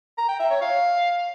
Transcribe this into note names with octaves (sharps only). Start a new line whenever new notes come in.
A#5
G5
E5
C#5
F5